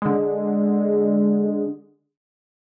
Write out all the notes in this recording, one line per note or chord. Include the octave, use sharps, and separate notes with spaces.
D3 G#3